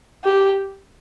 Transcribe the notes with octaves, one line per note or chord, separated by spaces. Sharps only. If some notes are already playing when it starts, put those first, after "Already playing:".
G4